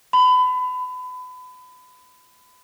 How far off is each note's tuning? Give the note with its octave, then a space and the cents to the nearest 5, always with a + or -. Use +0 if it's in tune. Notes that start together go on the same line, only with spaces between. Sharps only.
B5 +30